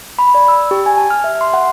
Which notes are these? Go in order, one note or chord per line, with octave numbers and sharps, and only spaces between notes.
B5
D5
E6
G4
G#5
A5
F6
E5
C6
F#5